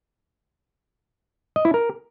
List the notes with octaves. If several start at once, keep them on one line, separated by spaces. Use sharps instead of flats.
D#5
E4
A#4